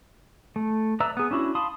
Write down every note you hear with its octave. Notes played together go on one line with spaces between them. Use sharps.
A3
B4 D5 E5 A#5 E6
B3 G#4
C#4 D4 E4 F#4
F5 A5 B5 C6 D#6